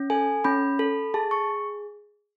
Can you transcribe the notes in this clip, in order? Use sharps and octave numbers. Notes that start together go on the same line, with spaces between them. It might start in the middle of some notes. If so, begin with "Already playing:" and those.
Already playing: C#4
A4 G#5
C#4 B5
A4
G#4 A5
C#6